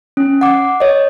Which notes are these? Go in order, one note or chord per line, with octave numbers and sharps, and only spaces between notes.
C#4
F#5 D6
C#5 D#5